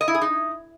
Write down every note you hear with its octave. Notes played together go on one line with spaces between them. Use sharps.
D#5
E4
G#4
D#4